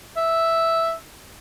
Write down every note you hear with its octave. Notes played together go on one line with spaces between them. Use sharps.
E5